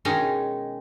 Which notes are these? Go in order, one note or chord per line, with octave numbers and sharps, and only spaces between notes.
B2 D#3 G#3 C#4 D#4